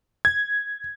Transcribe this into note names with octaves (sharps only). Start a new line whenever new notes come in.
G#6